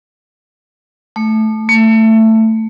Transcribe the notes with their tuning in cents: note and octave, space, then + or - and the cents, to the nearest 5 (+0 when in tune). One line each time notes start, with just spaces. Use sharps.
A3 -10
A3 +15